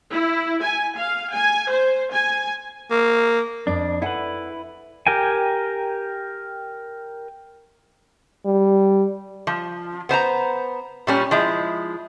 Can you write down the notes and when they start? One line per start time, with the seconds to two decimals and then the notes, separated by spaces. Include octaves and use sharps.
0.12 E4
0.62 G#5
0.98 F5
1.33 G#5
1.70 C5
2.12 G#5
2.91 A#3
3.67 F2 D4 D5
4.02 E4 A4 B4 F#5 G#5
5.07 G4 A#4 G5 G#5
8.45 G3
9.47 F3
10.09 B3 C5 A5 A#5
11.07 A#2 G3 C#4
11.31 F3 G#3 E4